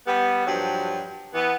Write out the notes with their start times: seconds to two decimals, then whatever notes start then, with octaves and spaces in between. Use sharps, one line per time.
0.07 G3 B3
0.47 G2 F3 F#3
1.34 E3 B3